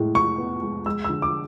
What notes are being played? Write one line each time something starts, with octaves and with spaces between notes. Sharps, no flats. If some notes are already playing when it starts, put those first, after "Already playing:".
Already playing: A2 G#3
A2 C#6
B3
G#3
G#3 E6
D3 E6
D6